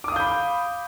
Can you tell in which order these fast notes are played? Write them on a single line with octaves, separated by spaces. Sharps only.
D6 D#6 F5 G6 B5